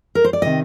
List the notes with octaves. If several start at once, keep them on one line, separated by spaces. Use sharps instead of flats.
A#4
C5
D5
C3 D#3 D#5